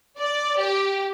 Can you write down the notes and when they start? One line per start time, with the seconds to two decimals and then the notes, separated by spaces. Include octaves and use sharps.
0.17 D5
0.58 G4